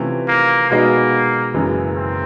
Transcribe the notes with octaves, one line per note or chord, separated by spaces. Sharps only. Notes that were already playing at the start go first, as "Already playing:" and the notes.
Already playing: C3 E3 A3 C#4 F4
A#3
B2 G#3 A#3 B3 D#4
F#1 F#2 C#3 E3 G#3
C4